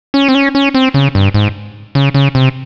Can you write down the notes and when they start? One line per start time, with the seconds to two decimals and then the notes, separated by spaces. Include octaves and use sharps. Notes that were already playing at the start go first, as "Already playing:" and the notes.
0.14 C#4
0.29 C4
0.35 C#4
0.55 C#4
0.75 C4
0.94 C#3
1.15 G2
1.34 G#2
1.95 C#3
2.14 C#3
2.35 C3